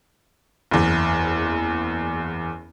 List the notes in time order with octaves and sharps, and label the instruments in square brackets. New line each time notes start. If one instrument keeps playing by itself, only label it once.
[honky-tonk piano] F#1 E2